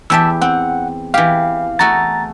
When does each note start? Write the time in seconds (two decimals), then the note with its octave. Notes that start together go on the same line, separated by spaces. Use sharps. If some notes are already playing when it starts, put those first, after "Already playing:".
0.10 E2 G4 E5 A5 E6
0.41 C4 F#5
1.14 E3 G4 F5
1.79 A3 F#4 G#4 A#5 A6